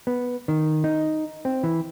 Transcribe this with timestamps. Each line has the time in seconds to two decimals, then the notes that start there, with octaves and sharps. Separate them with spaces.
0.07 B3
0.48 D#3
0.84 D#4
1.45 C4
1.63 E3